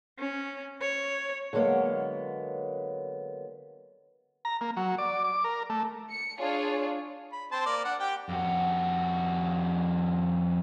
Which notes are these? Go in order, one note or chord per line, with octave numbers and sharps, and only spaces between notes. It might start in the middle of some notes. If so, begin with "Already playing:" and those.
C#4
C#5
D3 F#3 G#3 A#3 B3
A#5
A#3
F#3
D5
D6
A#4
A3
C#7
D4 F4 G#4 C#5
B5
C4 C5 A5
A#3 D5
D4 F#5
G4 G5
F2 F#4